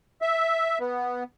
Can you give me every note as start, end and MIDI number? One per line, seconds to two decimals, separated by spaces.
0.22 0.78 76
0.80 1.24 59